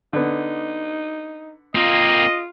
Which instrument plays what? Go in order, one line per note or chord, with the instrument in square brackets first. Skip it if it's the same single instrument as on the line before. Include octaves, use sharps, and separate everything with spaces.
[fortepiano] D3 B3 [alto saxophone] D#4
[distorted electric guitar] A#3 C4 [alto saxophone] F4 [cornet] D#5